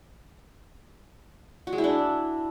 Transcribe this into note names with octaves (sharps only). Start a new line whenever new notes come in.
F#4
G#3
E4
D4